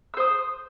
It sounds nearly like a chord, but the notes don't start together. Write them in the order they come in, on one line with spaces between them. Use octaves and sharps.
E6 C5 D#6